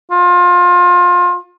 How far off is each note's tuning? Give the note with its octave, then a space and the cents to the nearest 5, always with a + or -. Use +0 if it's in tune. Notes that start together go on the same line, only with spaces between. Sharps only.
F4 +25